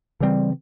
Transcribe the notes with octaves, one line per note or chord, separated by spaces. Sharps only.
C#3 E3 G3 C4